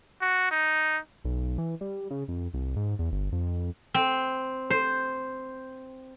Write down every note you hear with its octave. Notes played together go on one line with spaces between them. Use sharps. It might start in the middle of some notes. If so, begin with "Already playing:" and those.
F#4
D#4
B1
E3
G3
C#3
F2
C2
G#2
E2
G1
F2
C4
C5